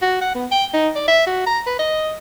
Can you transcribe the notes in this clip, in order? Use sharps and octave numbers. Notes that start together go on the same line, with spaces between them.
F#4
F#5
B3
G5
D#4
D5
E5
F#4
A#5
B4
D#5